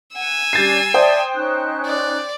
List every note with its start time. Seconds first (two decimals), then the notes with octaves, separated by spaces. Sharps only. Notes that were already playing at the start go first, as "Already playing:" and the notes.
0.15 F#5 G#5 E6
0.53 G3 C#4 D4 G6 A6 C7
0.94 C5 D5 E5 G5 A5 D#6
1.34 C#4 D#4 F#6
1.86 D5